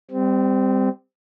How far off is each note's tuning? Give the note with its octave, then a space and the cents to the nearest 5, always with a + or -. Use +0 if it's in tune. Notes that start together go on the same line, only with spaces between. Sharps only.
G3 +20 C4 -20